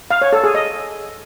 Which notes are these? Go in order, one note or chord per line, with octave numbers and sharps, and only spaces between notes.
F5
C#5
A4
G#4
D#5